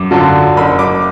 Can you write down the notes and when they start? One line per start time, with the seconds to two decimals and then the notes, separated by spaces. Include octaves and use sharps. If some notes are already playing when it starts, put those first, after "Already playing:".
Already playing: F#2 D6
0.11 D3 F#3 D4 F4
0.57 F#1 B5
0.79 D6